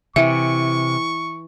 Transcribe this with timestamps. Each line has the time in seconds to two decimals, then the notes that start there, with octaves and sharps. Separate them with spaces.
0.16 C3 E3 E5 C#6